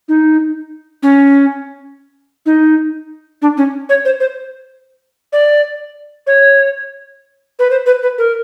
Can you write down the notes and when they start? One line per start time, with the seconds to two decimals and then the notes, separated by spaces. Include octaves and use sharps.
0.08 D#4
1.03 C#4
2.46 D#4
3.42 D4
3.57 C#4
3.89 C#5
4.05 C5
4.20 C5
5.33 D5
6.27 C#5
7.59 B4
7.70 C5
7.86 B4
8.03 B4
8.18 A#4